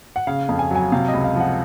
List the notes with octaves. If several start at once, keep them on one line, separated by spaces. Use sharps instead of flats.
F#5
C#3 F5
F2
G#5
F#3 G#5
C3 F5
D#5
C#2
F5
F3 F#5